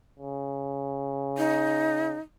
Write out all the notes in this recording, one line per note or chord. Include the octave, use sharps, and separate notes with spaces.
C#3
D#4